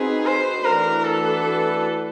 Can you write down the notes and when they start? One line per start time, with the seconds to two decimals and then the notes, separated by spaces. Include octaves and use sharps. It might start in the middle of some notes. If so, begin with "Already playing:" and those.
Already playing: C4 D#4 F#4 G#4 B4
0.26 C5
0.65 E3 A3 D4 F#4 A#4 B4
1.04 A4